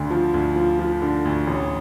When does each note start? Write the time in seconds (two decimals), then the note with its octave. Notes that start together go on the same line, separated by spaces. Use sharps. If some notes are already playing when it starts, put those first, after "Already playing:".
Already playing: D2 D3
0.10 F3
0.34 D2
0.56 F3
0.79 F3
1.02 D3
1.25 D2
1.47 A1